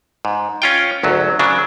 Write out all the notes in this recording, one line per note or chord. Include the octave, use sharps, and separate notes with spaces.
G#2
C#4 F4 G5
G#1 D2 F#3
C#3 F#3 D4